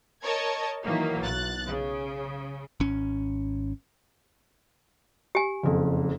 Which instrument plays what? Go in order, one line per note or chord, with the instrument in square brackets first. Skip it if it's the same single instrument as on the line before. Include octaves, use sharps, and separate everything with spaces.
[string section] A#4 C#5 D#5 A5 C#6 G#6
D#3 E3 F#3 A#3
B1 F#6 A6
C#3
[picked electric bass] G#1 C#4
[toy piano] G4 G#5
[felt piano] F#1 F2